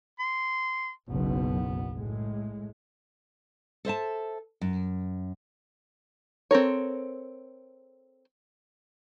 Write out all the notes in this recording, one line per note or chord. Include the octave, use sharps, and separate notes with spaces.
C6
F#1 B1 B2 B3
A2 G#3
A4 C5 E5 A5
F#2
C4 A4 A#4 C#5